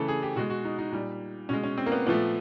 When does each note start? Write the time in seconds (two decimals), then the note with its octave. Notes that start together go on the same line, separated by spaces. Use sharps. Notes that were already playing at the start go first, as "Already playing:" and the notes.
Already playing: C#3 E3 A3 A4
0.08 G#4
0.23 G4
0.36 B2 G#3 F#4
0.50 F#4
0.65 D#4
0.79 D#4
0.92 A#2 G3
1.49 B2 G#3 C#4
1.63 C#4
1.78 C4
1.86 A#3
1.92 B3
2.07 A#2 F3 A3 B3